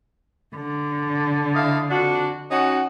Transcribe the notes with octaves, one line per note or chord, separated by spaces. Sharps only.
D3
E4 D#5 F5
F2 D4 F#4
C#4 D#4 F#4